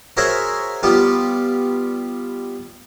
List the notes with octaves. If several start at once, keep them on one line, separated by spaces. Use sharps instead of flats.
F#4 G#4 A#4 C5 C#5 E5
G3 B3 F4